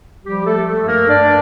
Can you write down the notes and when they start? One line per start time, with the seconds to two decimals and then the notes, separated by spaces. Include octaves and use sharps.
0.25 F3 G3 G4
0.46 A3 A4
0.54 F3
0.66 A3 A4
0.81 G2
0.87 A#3 A#4
1.08 G2 D4 D5